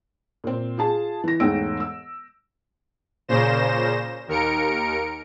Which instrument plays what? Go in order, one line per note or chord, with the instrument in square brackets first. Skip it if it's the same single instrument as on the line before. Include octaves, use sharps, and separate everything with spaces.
[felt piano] A#2 C4
F4 G#4 A5
E3 A#6
E1 G#2 A3 G5 E6 D7
E6
[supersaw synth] A#2 C#3 C5 A#6 E7
D#2 A#4 C#7 D7